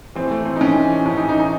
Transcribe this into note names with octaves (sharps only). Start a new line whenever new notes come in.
A2 E3 C4
A3
C4
D#4
A2 E3 C#4
A2 E3 C#4
D#4
D#4
D#4